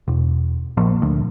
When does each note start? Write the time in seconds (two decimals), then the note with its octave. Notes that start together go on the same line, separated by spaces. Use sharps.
0.08 E1
0.77 A#1
1.02 D2